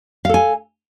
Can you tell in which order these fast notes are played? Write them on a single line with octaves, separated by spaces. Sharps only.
F5 A4 G#5